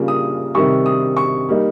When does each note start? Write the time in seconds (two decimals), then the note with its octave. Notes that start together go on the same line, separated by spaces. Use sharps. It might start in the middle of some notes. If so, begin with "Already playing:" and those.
Already playing: C#3 G3 A#3 F4
0.08 D#6
0.54 C3 D#3 G3 C#6
0.86 D#6
1.17 C#6
1.49 G3 A#3 D#4